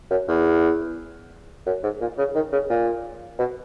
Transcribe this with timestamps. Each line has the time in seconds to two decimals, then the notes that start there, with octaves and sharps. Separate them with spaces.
0.11 F#2
0.28 E2
1.66 F#2
1.83 G#2
2.01 A#2
2.18 C#3
2.35 D#3
2.53 C#3
2.70 A#2
3.39 B2